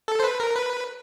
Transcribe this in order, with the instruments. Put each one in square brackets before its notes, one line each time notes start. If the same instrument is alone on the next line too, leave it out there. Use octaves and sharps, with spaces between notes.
[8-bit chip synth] A4
C5
B4
A#4
B4